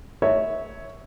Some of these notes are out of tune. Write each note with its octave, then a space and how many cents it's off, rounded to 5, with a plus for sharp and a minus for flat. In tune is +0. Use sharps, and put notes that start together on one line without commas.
C#5 +0 E5 -20